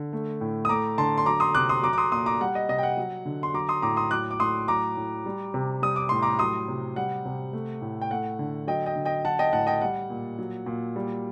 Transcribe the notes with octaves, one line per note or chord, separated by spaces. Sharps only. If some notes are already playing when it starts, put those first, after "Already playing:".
Already playing: D3
A3
A2
D#6
A3 A#5 D6
D3 A5 C6
C6
F#3 A#5 D6
C6 D#6
C3 D6 F#6
C6 D#6
F#3 A#5 D6
D6
C6 D#6
A#2 C6 D#6
A#5 D6
G3 F#5
D#5
C3 D#5
G5
F#5
F#3
D3
C6
F#3 A#5 D6
C6 D#6
A2 A#5 D6
C6 D#6
F#3 D6 F#6
D6
A2 C6 D#6
F#3 A#5 D6
A2
G3
C3
G3 D#6
D6
A2 C6
A#5 D6
F#3 C6 D#6
C3
G3 F#5
C3
A3
A2
G5
A3 F#5
D3
F#3 D#5 G5
D#5 G5
D3
D#5 G5
F#3 F#5 A5
D#5 G5
A2 F#5 A5
D#5 G5
G3 F#5
A#2
F#3
A#2
G3